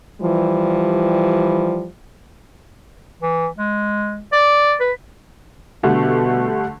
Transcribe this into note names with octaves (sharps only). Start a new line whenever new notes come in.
E3 F3 G3
E3
G#3
D5
B4
B2 D3 G3 A3